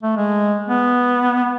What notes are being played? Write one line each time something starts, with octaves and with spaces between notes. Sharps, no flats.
A3
G#3
B3